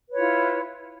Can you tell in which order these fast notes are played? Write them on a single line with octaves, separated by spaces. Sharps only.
B4 C#5 F4 E4